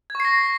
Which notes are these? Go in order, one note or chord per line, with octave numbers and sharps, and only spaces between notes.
C#6 G#6 A#6 C7